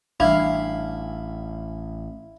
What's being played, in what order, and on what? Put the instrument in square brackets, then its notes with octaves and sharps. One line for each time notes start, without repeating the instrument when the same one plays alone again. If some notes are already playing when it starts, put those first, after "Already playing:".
[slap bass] A1 [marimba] E3 G3 D4 [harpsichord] E4 [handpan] F5